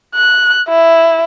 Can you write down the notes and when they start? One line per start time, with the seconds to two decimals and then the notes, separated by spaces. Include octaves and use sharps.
0.15 F#6
0.68 E4